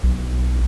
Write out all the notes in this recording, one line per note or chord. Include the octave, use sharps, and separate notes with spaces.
B1